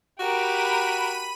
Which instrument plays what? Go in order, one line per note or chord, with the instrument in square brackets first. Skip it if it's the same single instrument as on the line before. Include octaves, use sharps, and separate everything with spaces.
[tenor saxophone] F#4 [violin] G4 A#4 [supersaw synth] B5 D#7